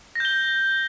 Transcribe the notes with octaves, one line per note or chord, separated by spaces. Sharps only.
G6 A#6 G7